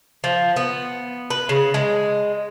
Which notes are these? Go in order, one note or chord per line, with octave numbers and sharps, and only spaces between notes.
F3
B3
B4
C#3
G#3